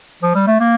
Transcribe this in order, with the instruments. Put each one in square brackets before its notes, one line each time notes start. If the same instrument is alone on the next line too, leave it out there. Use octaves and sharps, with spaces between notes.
[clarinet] F3
G3
A3
A#3